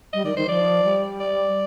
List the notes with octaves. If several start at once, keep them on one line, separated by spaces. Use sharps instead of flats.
G3 D#5
D#3 D5
D#3 C5
F3 D5
G3
D5